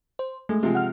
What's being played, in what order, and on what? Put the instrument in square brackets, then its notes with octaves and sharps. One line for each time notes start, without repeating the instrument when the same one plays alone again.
[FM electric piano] C5
[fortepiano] G#3 [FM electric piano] A3
[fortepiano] C3 F3 G#3
[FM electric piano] F#5 F6